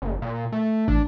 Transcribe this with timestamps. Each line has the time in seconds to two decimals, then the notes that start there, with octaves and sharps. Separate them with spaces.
0.02 F#1
0.22 A#2
0.52 A3
0.88 A1 A2 D4